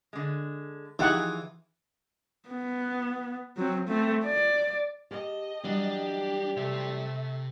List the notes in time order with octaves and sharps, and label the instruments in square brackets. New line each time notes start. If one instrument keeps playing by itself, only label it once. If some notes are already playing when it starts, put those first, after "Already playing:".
[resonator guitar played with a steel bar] D3 G#3
[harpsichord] E3 [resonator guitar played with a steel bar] F3 G#4 [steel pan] D#4 G4 F#5
[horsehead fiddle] B3
F#3 C4
A3 C4
D5
[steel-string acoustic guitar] G4 A5 [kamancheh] D#5
[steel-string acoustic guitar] E3 F#3 G3 [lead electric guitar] D4 [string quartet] G4
[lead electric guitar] C3 C5 [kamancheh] A3 E5